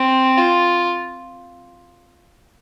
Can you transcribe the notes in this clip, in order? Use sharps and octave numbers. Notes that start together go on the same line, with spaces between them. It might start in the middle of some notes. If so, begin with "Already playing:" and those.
Already playing: C4
F4